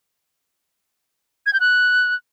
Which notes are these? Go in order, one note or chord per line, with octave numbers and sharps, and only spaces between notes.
G#6
G6
F#6